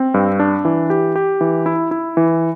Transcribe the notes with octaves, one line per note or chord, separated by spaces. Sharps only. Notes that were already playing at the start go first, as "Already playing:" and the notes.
Already playing: C4
G2
D4
E3
G4
G4
E3
E4
E4
E3